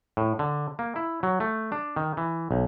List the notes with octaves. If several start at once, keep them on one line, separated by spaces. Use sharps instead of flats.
A2
D3
A#3
E4
F#3
A3
D4
D#3
E3
B1